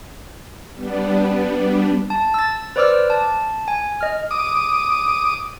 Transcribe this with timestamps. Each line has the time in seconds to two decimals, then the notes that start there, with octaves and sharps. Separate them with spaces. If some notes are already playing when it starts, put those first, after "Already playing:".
0.74 G3 B3 D4
2.10 A5
2.34 E6 A6
2.76 B4 C5 D5 D6 E6 F6
3.10 A5
3.68 G#5
4.01 D#5 F6
4.31 D6 D#6